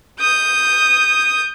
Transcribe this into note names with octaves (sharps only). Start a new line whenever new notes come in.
D#6 G6